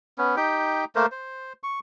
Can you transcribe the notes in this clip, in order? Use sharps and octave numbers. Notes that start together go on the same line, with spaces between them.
B3 C#4
D#4 G4 G5
A3 A#3 A#4 C5
C5
C#6